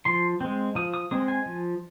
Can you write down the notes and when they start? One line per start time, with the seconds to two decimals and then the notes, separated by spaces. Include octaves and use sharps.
0.05 F3 C6
0.41 G#3 C4
0.75 F3 D#6
0.94 D#6
1.11 G#3 C4 D#6
1.28 G#5
1.46 F3